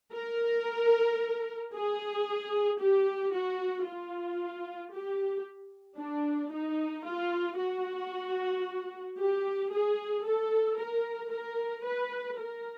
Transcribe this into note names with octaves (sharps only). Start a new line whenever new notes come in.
A#4
G#4
G4
F#4
F4
G4
D4
D#4
F4
F#4
G4
G#4
A4
A#4
A#4
B4
A#4